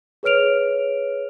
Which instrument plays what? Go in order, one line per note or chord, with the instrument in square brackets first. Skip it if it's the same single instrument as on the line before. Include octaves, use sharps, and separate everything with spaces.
[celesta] G#4 B4 C#5 F6 D7 F7